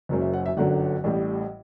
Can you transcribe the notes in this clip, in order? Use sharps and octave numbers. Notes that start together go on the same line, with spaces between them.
F#1 F#2 F#3
E5
F#5
E5
G1 F#2 D3 F#3 F#5
A1 A2 G3